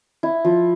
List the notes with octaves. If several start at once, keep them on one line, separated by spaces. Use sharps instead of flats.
E4
F3